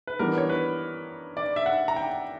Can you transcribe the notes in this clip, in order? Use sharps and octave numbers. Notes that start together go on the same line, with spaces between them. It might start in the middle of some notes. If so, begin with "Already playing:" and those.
B4
E3 G3 B3 D4 A#4
C#5
B4
D5
E5
F#5
A#5
G5